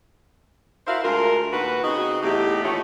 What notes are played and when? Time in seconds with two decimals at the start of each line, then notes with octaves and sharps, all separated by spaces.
0.86 E4 F#4 A#4 C5 E5 F5
1.03 D2 G#3 F4 A#4
1.51 D#2 A#2 F#4 B4
1.83 C#3 C4 D#4 F#4
2.22 E2 A2 D#4 G4
2.62 D#2 A2 A3 C#4 F4 A4